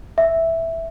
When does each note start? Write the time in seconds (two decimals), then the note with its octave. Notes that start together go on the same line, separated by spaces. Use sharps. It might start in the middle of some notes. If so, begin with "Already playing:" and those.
0.18 E5